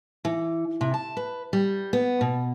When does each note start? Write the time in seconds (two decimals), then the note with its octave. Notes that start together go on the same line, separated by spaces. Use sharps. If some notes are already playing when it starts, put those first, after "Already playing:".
0.25 E3
0.81 C3
0.94 A5
1.17 B4
1.53 G3
1.93 B3
2.21 B2